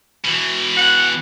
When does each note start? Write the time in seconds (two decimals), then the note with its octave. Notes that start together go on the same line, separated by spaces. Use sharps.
0.25 B2 E3
0.77 F#5